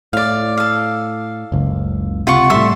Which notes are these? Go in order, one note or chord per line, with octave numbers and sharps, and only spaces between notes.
A2 D5 F5
A4 F5
F#1 C#2
C3 F4 F#5 C#6
A2 G3 A4 E5 C6